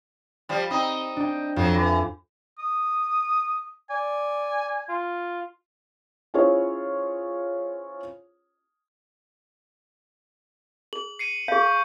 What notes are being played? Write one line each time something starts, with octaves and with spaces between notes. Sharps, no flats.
F3 G3
C4 D#4 D#6
D4 G5
F2 F3 F#3
E3
D#6
D5 G#5
F4
C#4 E4 F4 G#4 C5 C#5
G#4 F#7
C7 C#7 D#7
G#4 F5 C#6 G6